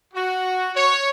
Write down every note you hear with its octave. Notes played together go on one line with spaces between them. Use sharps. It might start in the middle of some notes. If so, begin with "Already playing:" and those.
F#4
C#5